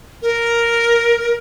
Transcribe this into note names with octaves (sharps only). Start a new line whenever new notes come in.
A#4